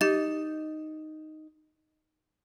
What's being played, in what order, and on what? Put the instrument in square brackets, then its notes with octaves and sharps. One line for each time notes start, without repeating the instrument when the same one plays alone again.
[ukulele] D#4 [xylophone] G4 A6